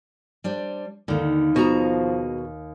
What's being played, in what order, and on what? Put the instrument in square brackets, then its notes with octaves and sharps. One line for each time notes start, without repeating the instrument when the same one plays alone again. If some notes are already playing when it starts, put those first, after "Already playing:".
[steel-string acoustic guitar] G3 D4 C5
[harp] D#2 [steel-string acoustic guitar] D3 A#3
[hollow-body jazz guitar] B2 [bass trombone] F3 [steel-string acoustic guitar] F#4 G#4 A#5